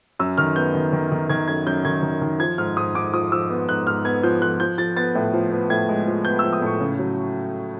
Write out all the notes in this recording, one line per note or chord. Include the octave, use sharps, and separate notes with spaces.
F#2 E6
D#3 F6
B3 G6
D#3
D#3
D#3
D#3 G#6
F#2 G#6
F#2 G6
D#3 G#6
D#3
D#3
F3 G#6
G#2 F6
G#2 D#6
G#2 D6
F3 D#6
F3 E6
B3
G#2 F#6
G#2 F6
B3 G#6
F3 G6
F3 F#6
F3 G6
F3 A6
B3 A6
A2
F3
B3
A2 G#6
G#3
F3
B3 G6
E6
F3
D#6
A2 C#6
C#3
F#3